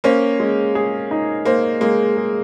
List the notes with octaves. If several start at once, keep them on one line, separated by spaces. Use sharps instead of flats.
A#3 C#4 C5
G#3
G#4
D#4
A#3 C5
G#3 A#3
G#4